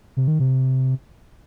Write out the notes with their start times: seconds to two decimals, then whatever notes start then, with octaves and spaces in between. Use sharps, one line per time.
0.17 C3
0.28 D#3
0.39 C3